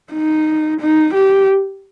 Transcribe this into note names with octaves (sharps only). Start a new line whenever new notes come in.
D#4
D#4
G4